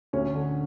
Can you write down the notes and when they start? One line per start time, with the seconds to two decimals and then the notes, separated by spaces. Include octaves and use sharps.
0.13 D2 C#4
0.35 D3